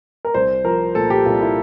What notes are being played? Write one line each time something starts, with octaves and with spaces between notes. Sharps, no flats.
A#4
C2 C5
F3 A#4
A#2 A4
G4
C2 F4
E4